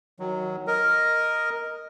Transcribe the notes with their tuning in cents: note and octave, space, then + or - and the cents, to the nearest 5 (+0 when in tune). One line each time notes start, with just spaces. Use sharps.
D#3 +25 F#3 +0
A#4 +0 D#5 +0